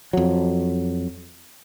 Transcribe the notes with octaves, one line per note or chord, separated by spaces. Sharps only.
F2 F#3